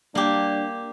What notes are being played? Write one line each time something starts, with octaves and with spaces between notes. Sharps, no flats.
G3 A#3 D4 G4